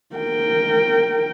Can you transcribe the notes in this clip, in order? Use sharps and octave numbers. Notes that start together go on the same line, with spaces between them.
A#4 G5